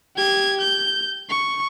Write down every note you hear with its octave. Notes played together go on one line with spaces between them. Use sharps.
G4 G#6
G6
C#6